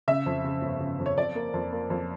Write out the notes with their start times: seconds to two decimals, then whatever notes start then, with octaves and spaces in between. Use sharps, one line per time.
0.08 C#3 E5
0.26 F2
0.44 C#3
0.62 G1
0.80 C#3
0.99 F2
1.06 C#5
1.17 F2 D5
1.35 A#3
1.54 F2
1.72 A#3
1.90 F2